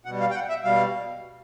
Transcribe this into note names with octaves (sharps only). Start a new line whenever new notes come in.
B2 G3 F#5
F5
G5
F#5
E5
B2 G3 F5